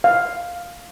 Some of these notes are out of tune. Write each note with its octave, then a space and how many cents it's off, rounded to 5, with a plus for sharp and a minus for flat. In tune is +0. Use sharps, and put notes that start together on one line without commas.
F5 +5